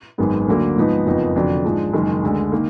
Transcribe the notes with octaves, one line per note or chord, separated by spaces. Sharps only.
G#1 F#2 D#3 G#3 B3
D2 D3 F#3 A#3
G#2 F3 B3 D#4
F#1 F2 F3 B3 D#4
F1 F2 D3 F#3 D4
G#2 F3 G#3 D4
F#1 F#2 D#3 G#3
D2 D3 G#3
D#3 A#3